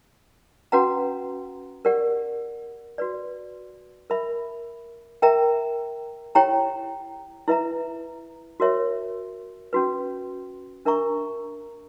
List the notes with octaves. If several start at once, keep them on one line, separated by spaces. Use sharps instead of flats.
C#4 F#4 B4 F#5 A#5
G4 A#4 D5 F#5
F#4 B4 D5
A#4 E5 B5
A#4 E5 G5 A#5
E4 G4 C#5 G5 A#5
E4 B4 E5 A#5
F#4 A#4 C#5 E5
C#4 F#4 B4
D4 A#4 E5 A#5 C#6